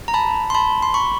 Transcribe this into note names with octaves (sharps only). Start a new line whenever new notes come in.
A#5
A5 B5
C6
A5 B5
C6
B5 C#6